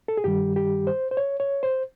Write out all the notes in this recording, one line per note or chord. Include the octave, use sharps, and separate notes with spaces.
A4
G#4
G2 D#3 G3 G4
G4
C5
C5
C#5
C#5
C5